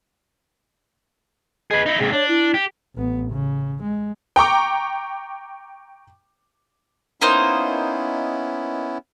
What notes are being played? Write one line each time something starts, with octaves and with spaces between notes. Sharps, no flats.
G#4 B4 D#5
D#4 E4
G#2 C3 G#4
D4 C#5
E4
G4
A1 B3
C#3
G#3
G5 A#5 C#6 D6
A#3 B3 C#4 D#4 E4 C5